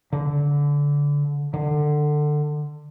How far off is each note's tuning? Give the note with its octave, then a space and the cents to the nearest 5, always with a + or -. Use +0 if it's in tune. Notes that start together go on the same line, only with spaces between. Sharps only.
D3 -20
D3 +20